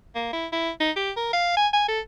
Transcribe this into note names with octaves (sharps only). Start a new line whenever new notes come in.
A#3
E4
E4
D#4
G4
A#4
F5
G#5
G#5
A4